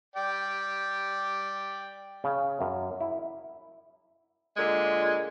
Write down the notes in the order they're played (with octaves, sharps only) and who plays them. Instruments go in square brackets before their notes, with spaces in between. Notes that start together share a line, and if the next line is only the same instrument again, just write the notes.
[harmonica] D5 G5
[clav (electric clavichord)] C#3
F#2
E4
[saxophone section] A#2 D3 G#3